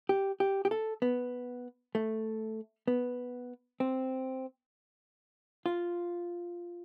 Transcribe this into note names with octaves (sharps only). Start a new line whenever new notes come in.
G4
G4
G4
A4
B3
A3
B3
C4
F4